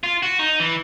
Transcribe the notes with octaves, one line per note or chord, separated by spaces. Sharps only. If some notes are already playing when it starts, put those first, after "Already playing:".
F4
F#4
D#4
E3